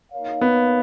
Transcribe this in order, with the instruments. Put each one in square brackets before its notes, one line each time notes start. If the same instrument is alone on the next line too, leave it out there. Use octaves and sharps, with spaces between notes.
[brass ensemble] A#3 D#4 A#4 C#5 F5
[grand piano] B3